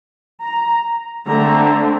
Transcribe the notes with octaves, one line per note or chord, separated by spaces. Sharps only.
A#5
D3 A3 C4 A#5